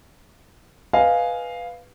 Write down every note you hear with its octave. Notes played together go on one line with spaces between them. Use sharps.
B4 D#5 F5 G#5